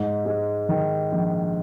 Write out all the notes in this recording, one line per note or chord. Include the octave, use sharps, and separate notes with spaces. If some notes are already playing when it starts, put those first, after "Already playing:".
Already playing: G#2
G#3
D#3
A#1